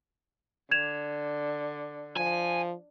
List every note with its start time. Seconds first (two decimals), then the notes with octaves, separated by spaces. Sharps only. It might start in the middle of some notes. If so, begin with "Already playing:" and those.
0.71 D3 G#6 E7 F7
2.17 F3 G#5